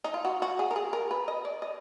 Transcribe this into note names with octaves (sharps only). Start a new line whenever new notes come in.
D#4
F4
F#4
F#4
G#4
A#4
G#4
A#4
B4
D#5
D5
D#5